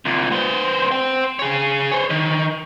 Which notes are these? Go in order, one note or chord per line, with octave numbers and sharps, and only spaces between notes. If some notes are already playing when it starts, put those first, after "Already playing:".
C2 A#2
B3 C5
C5 G5
G#4 C#5
C5 C#5
D#3